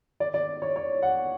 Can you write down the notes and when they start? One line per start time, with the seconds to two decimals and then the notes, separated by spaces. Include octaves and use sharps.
0.20 D5
0.34 D5
0.62 C#5
0.76 C#5
1.02 F#5